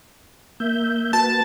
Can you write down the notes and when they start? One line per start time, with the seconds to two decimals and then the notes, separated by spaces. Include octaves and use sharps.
0.60 A#3 E5 G6
1.13 A#3 F#4 B4 A5